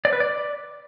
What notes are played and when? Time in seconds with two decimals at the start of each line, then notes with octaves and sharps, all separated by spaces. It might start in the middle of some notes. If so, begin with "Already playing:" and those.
0.05 D5
0.13 B4
0.20 D5